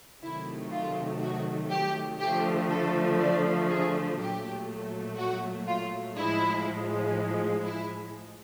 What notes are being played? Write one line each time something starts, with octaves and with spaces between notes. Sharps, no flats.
C3 D#3 F#3 A3 E4
F4
F#4
G4
D3 F3 A3 G4
A4
D5
G#4
A#2 F#3 A3 G4
F#4
F4
A2 F3 G#3 E4
E4